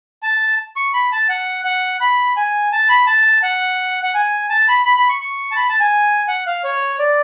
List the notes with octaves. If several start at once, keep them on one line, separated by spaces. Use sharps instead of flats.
A5
C#6
B5
A5
F#5
F#5
B5
G#5
A5
B5
A5
F#5
F#5
G#5
A5
B5
B5
B5
C#6
C#6
A5
B5
A5
G#5
F#5
F5
C#5
D5